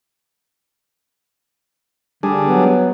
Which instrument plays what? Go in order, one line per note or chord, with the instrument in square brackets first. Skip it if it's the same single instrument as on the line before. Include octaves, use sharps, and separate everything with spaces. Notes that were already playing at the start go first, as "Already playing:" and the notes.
[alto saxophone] D3 [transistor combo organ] G3 D4 G#4
[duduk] F#3 [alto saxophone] B3